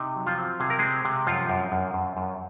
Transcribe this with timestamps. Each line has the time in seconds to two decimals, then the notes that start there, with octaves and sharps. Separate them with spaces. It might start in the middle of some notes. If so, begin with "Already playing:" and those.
Already playing: C3 D#4
0.16 F#3
0.26 F3 F4
0.38 C4
0.60 C3 G#4
0.70 A#4
0.79 G#3 C4 G#4
1.05 C3
1.27 F#2 F3 F4
1.50 F#2
1.72 F#2
1.94 F#2
2.17 F#2